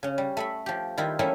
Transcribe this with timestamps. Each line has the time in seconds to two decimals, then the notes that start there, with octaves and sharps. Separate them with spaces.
0.03 C#3 C#4
0.18 G3
0.37 A3 E5 B5
0.66 F3 G4
0.98 D#3 G3 E4 F4
1.19 E3 G3 A3 A#3 C#4 E4